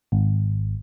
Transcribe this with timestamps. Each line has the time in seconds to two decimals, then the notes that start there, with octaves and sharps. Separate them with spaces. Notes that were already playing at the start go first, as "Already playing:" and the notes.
0.12 G#1